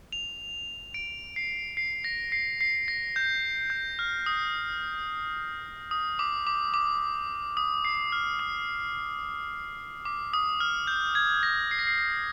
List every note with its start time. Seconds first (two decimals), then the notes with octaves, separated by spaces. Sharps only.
0.12 F7
0.94 D7
1.36 C7
1.77 C7
2.04 A#6
2.32 C7
2.61 C7
2.88 A#6
3.16 G6
3.70 G6
3.99 F6
4.26 D#6
5.91 D#6
6.19 D6
6.47 D6
6.74 D6
7.57 D#6
7.85 C7
8.12 F6
8.39 D#6
10.05 D6
10.33 D#6
10.60 F6
10.87 G6
11.15 G#6
11.43 A#6
11.71 C7
11.79 A#6
11.87 C7
11.98 A#6